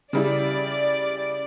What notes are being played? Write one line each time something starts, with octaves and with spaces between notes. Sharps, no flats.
C#3 G3 E4 D5